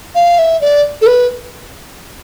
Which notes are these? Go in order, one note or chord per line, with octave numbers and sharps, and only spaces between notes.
F5
E5
D5
A4
B4